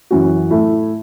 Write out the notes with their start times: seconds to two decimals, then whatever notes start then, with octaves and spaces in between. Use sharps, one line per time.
0.11 F#2 E3 C#4 F#4
0.50 A2 A3 E4